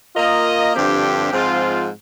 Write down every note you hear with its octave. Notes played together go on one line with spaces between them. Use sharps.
A#3 F4 A#4 D#5
G2 D3 F3 C4 G4
G#2 F3 G#3 C4 F4